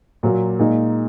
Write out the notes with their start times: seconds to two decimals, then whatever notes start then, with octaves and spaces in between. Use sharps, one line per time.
0.23 A#2 F#3 A#3
0.59 A#2 G#3 D#4